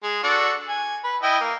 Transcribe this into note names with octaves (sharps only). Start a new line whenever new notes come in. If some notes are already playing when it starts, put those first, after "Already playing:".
G#3
D4 F#4 A4
G#5
B4
E4 D#5 G5
A#3